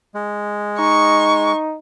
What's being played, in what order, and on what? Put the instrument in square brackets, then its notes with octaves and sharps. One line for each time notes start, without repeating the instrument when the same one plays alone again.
[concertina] G#3
[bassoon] D#4 [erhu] C#6